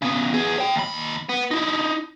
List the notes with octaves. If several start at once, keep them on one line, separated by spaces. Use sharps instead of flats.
C#3 B3
B3 G#4
C#5 G5
D#2 B5
B3
D#4 E4